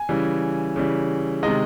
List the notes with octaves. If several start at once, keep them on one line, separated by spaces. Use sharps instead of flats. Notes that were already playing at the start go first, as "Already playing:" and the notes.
Already playing: G#5
C#3 E3 G3
C#3 E3 G3
C3 D#3 G#3 D#5